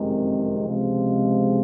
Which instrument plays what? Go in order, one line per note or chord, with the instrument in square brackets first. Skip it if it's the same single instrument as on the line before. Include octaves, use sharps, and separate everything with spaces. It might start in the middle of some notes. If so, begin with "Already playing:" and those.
Already playing: [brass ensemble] F#1 F2 C3 D#3 G#3
C#2 C3 F3 G#3